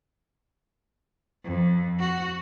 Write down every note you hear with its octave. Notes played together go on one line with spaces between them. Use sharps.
F2
F#4